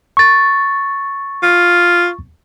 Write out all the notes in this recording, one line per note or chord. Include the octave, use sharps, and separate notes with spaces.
C#6 A6
F4